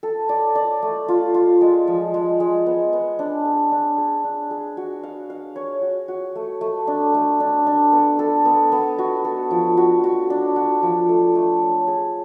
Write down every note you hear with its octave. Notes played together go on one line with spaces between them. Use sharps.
A4
D5
D5
A3
F4
F4
G#3
F3
G#3
G#3
B3
B3
D4
G#4
D4
G#4
D4
G#4
F#4
F5
F5
C#5
F#4
F#4
A3
A3
D4
A3
D4
D4
B3
A4
B3
B3
F#4
A4
F3
F#4
F#4
D4
F#4
F3
A3
A3
C#5
G#4